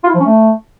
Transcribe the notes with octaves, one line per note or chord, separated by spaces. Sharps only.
F4
E4
F3
C#4
A3